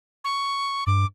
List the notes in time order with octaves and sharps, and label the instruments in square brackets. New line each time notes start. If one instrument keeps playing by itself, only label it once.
[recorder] C#6
[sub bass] G2 [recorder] D6